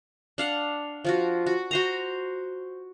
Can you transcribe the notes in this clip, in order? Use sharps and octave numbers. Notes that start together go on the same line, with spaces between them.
D4 F5 F#5
F3 F4 F#4
F#4
F#4 C5 A#5